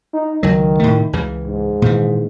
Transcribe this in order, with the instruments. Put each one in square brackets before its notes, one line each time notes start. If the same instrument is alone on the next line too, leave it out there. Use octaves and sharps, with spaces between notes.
[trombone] D#4
[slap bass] C#2 F#3 [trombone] D#3
[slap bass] A2 C3 A3
C#2 C#3 E3
[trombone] G#2
[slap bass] A#2 D#3 E3